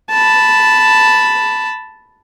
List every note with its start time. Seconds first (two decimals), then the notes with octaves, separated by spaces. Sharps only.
0.10 A5 B5